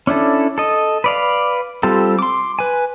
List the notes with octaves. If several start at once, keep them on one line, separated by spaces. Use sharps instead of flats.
C#4 D4 E4 A4
A4 D#5
B4 D5 F5
G3 C4 F4 G4 A4
C6 D6
B4 G#5